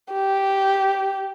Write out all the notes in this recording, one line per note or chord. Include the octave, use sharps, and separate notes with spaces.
G4